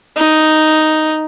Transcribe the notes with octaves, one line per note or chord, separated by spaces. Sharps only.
D#4